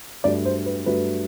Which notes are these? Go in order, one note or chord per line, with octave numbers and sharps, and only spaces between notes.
G2 F#3 A3 D5
C5
B4
G2 F#3 A3 B4